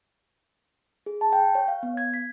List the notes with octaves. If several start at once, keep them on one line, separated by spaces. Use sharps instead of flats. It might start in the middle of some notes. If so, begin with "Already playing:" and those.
G#4
A5
G5
C#5
F5
B3
G#6
B6